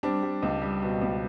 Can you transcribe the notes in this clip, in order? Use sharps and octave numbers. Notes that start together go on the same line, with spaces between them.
G3 C4 D4
G3
C#2
G3
B2
C#2